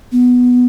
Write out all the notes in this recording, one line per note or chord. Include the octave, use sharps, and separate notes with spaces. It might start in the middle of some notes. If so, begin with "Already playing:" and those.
B3